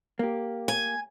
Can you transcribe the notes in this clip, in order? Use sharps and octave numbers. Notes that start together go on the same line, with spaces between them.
A#3 G4
G#5